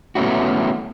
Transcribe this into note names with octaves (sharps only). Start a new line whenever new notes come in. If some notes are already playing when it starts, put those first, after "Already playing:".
A3 B3 C#4 E4 F#4